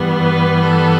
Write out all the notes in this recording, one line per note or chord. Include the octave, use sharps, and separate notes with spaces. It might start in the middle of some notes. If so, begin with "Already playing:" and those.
Already playing: G2 E3 G3 B3
B4
A4